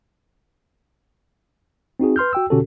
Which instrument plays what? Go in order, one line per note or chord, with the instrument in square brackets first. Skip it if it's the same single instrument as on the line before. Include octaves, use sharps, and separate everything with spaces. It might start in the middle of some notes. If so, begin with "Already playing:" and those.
[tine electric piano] C4 D#4 F#4 G#4
B4 C6 F6 G6
F#4 G5 E6
B2 D3 C#4 F#4 G4 A4